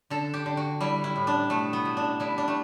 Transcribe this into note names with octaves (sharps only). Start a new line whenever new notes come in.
D3 A4
G4
D3
F#4
G3 E4
E4
A2
D4
B2 A3
B3
B2
D4
G3 E4
D4
A3